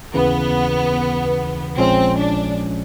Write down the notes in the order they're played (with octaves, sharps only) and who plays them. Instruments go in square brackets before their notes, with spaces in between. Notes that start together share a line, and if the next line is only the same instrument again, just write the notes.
[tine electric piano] D#2 C#3 E3 [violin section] B3
[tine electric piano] A#1 A#2 F3 G#3 C#4 [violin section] C4
[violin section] D4